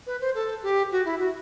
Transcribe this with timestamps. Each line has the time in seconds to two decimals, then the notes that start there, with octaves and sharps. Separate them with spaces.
0.06 B4
0.21 C5
0.35 A4
0.63 G4
0.92 F#4
1.05 E4
1.19 F#4